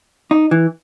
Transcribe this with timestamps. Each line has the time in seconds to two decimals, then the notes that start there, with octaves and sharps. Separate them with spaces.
0.31 D#4
0.51 E3